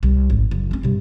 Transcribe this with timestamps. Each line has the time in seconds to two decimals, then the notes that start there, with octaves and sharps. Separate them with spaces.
0.03 C2
0.30 G#1
0.51 F#1
0.71 C4 C#4
0.83 G2 C3